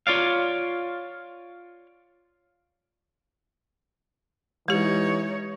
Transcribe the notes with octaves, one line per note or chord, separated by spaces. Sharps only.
F4 C#5 D5 F5
E3 G#3 D#4 G4 C#5